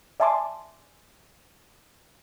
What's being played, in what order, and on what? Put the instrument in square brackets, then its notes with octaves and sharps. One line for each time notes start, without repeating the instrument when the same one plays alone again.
[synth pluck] D5 E5 G#5 A5 C6 D6